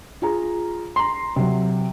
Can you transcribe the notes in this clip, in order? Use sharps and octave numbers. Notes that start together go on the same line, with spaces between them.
F4 G#4 A#5
A#5 C6
C3 F#3